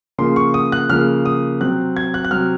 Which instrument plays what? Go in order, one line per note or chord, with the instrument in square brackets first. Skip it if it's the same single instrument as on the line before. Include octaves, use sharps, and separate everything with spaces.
[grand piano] C#3 F3 A#3 C6
C#6
D#6
F#6
C#3 F3 A#3 F6
D#6
C3 F#3 C4 F#6
G#6
F#6
F#6
C3 F#3 C4 F6